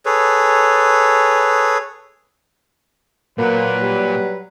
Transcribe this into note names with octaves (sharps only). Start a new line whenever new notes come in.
G#4 A4 B4 C#5
A#2 F#3 A#3 A#4 B4
G3